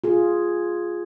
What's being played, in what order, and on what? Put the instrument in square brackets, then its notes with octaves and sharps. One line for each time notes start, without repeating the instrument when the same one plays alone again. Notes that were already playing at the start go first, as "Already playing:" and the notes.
[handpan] F4 G#4